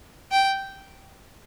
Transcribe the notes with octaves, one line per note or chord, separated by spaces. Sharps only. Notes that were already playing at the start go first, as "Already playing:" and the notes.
G5